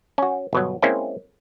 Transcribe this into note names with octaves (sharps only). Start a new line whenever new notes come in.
C#4 F#4
G1 B2 F#3
G#3 A#3 C4 C#4 E4